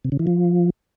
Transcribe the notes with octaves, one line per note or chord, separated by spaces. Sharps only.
C3
C#3
E3
F3